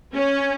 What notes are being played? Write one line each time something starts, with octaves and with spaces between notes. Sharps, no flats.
C#4